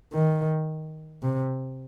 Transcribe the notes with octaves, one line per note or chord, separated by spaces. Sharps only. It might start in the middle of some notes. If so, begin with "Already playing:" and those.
D#3
C3